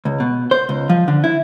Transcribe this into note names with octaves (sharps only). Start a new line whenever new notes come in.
C#2
B2
C5
C#2
F3
D3
E4